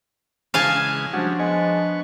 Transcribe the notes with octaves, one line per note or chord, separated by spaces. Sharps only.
C#3 E3 G#3 F5 G#5 A5
F3 G3 G#3 C#4 D4 F#4
G#3 B3 C#6